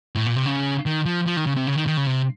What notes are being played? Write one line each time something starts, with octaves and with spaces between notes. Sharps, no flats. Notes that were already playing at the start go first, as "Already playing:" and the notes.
A2
A#2
C3
C#3
D#3
F3
F3
D#3
C#3
C3
C#3
D#3
D#3
C#3
C3